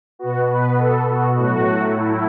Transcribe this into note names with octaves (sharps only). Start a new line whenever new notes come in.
B2 B3 F#4
B4
A4
F#4
A2 F#3 A3 F#4
E4